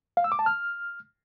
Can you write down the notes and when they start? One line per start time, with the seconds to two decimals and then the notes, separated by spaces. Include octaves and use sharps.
0.17 F5
0.24 E6
0.32 D6
0.39 A5
0.46 F6